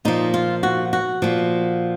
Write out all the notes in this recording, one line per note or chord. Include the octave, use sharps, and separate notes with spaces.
A#2 F3 D#4
F4
F#4
F#4
A#2 F3